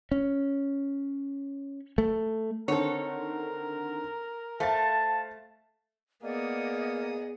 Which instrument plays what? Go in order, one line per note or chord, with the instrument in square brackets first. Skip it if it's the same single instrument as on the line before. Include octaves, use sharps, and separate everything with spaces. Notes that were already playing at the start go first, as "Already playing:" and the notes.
[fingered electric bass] C#4
A3
[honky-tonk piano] D3 D#3 C4 [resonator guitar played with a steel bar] A4 C#5 [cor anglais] A#4
[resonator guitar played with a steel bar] A3 [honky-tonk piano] C5 F5 A6 [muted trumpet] A5
[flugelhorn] A#3 [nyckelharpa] B3 D#6 [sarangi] G#4 [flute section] D5 D#5 F#5